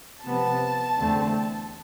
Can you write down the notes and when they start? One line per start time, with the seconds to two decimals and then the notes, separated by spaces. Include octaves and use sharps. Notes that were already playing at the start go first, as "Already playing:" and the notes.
0.23 C3 F3 B3 A5
0.97 E2 D3 A3 C4